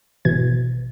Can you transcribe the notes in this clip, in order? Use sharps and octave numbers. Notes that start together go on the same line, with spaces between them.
G#1 B2 E3 G#6